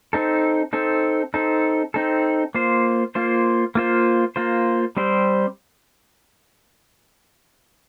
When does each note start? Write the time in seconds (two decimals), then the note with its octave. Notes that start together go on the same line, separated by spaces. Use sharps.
0.13 C4 D#4 A4
0.73 C4 D#4 A4
1.34 C4 D#4 A4
1.94 C4 D#4 A4
2.55 A#3 F4 C5
3.15 A#3 F4 C5
3.75 A#3 F4 C5
4.36 A#3 F4 C5
4.97 G3 C4 G4 C5